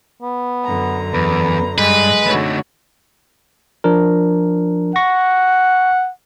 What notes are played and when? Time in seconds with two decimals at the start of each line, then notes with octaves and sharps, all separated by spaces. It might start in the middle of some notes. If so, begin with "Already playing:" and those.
0.22 B3
0.65 F#2 D3 A#5
1.14 E2 B4
1.78 G2 G#3 B4
2.27 D3 A3 D#4 F#4 C#5
3.84 F3 D4 A#4
4.96 F#5 C#6 A#6